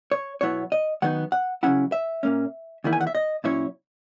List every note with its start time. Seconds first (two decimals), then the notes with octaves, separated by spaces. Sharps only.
0.12 C#5
0.41 B2 F#3 B3 E4 C#5
0.72 D#5
1.02 D#3 F#3 B3 D#4 F#5
1.32 F#5
1.63 C#3 F#3 C#4 E4 F#5
1.92 E5
2.23 A#2 A#3 C#4
2.84 E2 D#3 A#3 E4
2.93 G#5
3.01 F#5
3.07 E5
3.15 D#5
3.44 A#2 F#3 C#4 E4 C#5